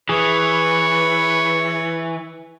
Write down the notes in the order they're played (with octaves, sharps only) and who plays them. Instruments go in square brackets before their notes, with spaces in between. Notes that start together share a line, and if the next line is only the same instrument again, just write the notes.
[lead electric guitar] E3 [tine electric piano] G#4 [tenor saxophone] B4 [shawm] C#5